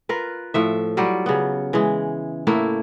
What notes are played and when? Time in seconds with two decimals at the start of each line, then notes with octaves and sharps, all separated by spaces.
0.09 F4 A#4 B4
0.54 A2 F3 E5
0.97 F#3 G3 F4 G4
1.26 C#3 B3
1.73 E3 G#3
2.47 A2 A3 A#3 E4